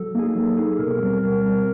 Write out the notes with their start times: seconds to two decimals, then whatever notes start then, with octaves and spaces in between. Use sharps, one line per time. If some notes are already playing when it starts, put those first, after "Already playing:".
Already playing: F#3 A4
0.15 A#3 D#4 G#4
0.35 F#3
0.57 A#3 D#4 G#4
0.79 B2 A#4
1.00 G3 C4
1.21 B2 A#4
1.43 G3 C4